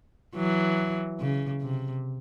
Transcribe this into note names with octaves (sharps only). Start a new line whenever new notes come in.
E3 F#3
C#3
C3